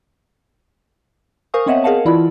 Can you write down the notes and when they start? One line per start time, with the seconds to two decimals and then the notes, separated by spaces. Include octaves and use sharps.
1.54 A#4 C5 F5 G#5 C#6 D#6
1.66 B3 C4 C#5 D#5 E5 F#5
1.84 G#4 A#4 D#5 F5 F#5 A5
2.05 E3 E4 F4 D5 B5